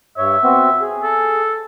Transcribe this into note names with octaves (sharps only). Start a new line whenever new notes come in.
G2 C#5 E5
B3 C4 F#4
G#4
A4